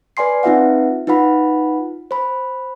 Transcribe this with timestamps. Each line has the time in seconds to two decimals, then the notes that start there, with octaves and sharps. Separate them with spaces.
0.17 B4 D5 G#5 C6 C7
0.43 C4 D#4 F4 B4 E5 F#5
1.07 D#4 F4 B4 F#5 B5
2.11 C5 B5